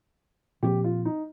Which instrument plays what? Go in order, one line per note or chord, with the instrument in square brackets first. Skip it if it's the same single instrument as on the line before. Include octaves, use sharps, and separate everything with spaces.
[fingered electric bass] A#2 F3 C4 [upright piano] G4
[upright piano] F4
D#4